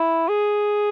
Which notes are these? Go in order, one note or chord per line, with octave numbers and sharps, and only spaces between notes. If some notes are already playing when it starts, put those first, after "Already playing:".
Already playing: E4
G#4